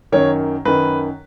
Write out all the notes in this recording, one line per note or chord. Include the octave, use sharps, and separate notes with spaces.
F#2 D#3 C#5
F#2 D#3 B4